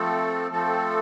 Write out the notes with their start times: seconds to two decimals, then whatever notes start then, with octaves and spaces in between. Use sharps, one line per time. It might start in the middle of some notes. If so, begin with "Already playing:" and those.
Already playing: F3 A3 C4 A4
0.51 F3 A3 C4 A4